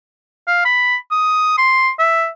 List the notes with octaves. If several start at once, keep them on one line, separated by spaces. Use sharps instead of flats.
F5
B5
D#6
C6
E5